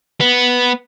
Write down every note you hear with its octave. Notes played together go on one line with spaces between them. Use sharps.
B3